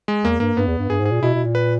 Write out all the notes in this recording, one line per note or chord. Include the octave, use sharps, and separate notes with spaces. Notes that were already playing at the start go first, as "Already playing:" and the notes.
G#3
E2 A#3
G2 A#3
G2 B3
E2
G2
G2 G#4
G#2
G#4
A#2
B2 E4
B2
A#2
B4